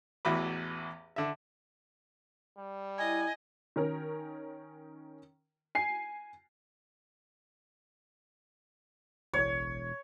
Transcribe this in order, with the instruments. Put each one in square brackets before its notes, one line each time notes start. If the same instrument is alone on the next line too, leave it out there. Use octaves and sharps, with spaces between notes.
[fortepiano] A1 E2 E3 F#4 B5 D6
D3 E5
[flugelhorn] G3
[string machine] E4 [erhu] D#5 [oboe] G#5
[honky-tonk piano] D#3 C#4 A#4
G#5 C7
[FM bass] E1 [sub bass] A1 [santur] C#5